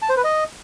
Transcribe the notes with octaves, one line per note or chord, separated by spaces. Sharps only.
A5
C5
B4
D#5